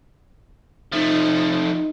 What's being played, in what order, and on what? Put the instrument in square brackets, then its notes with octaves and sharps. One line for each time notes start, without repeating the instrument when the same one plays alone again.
[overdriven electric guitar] F3 A3 [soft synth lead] D#4